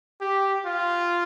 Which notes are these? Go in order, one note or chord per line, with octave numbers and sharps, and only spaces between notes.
G4
F4